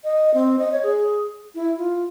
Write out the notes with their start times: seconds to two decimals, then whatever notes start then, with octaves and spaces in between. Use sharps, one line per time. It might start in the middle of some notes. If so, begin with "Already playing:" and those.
0.04 D#5
0.34 C4
0.59 D#5
0.72 C#5
0.83 G#4
1.55 E4
1.77 F4